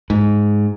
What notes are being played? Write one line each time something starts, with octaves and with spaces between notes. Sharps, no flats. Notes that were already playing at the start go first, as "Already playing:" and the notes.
G#2